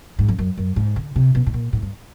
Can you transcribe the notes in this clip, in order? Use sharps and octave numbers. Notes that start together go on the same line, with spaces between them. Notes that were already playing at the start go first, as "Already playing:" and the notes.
G#2
F2
F#2
F#2
G#2
D3
C3
B2
A2
A#2
A2
G2